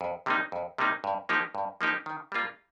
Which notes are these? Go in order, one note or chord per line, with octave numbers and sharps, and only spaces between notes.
F2
C3 G3 A#3 D#4
F2
C3 G3 A#3 D#4
G2
F3 A#3 D#4 G4
G2
F3 A#3 D#4 G4
D#3
G3 A#3 F4